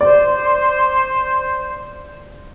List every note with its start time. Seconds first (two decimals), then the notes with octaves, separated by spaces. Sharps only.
0.01 C5 D5